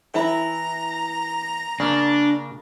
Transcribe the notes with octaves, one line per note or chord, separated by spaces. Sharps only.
E3 E4 A#5 B5
C#3 A#3 D4